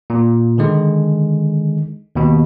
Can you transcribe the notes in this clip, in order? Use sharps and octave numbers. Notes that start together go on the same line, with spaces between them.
A#2
D3 D#3 G#3
D#2 B2